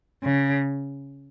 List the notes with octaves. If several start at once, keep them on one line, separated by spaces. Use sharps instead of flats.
C#3